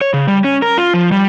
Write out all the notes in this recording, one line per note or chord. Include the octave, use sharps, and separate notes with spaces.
C#5
C#3
G3
C#4
A#4
F4
F3
G3